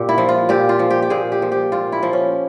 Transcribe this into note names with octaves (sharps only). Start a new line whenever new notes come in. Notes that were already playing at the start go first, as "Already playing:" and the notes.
Already playing: A#2 G4
E4
F3
F4
A#2 G4
F4
F3
G4
G4
A#2 G#4
G4
F3
G4
A#2 F4
E4
F3
C#4